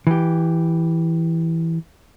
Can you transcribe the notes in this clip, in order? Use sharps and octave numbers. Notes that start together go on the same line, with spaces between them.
E3 G4